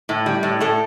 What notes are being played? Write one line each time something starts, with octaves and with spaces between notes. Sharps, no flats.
A2
G3
A2
A2 A4